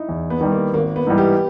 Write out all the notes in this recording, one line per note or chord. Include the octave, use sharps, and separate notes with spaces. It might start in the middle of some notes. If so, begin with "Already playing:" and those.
Already playing: D#4 E4
E2
B3
D#3 G3
A#3
G#1 A#3
B3
G#2 E3 G3
G4